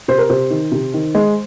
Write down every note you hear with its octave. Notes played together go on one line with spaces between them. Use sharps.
C3 C5
A#4
C3 C5
D#3
C3
D#3
G#3